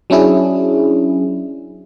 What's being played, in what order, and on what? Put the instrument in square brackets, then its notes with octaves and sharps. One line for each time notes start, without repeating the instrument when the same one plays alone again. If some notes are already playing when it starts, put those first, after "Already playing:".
[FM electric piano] F#3 C#4 D4 E4 G#4